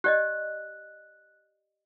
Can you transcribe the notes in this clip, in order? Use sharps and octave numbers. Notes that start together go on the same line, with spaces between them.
G4 D5 D#5 F#6